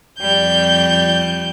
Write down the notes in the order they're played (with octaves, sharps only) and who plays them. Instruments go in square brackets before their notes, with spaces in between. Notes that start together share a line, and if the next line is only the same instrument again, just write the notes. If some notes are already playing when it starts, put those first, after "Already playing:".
[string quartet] F2 G3 G6